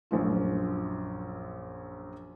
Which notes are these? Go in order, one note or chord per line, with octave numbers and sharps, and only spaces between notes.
A#1 F#2 F4